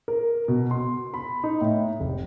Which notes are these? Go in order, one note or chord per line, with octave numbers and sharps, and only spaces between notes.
A#4
B2
C6
B5
D#4
A2
F1